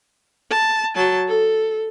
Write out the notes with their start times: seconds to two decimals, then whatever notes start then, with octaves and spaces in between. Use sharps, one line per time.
0.50 A5
0.95 F#3 A5
1.28 A4